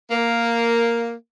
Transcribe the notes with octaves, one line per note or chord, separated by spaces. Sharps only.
A#3